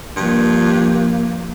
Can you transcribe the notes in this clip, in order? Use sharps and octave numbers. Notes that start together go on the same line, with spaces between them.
G2 F3 A#3